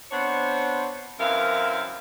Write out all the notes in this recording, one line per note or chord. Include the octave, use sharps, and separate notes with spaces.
B3 C4 D4 C5 C#5
F#2 E3 C4 E4 A#4 F5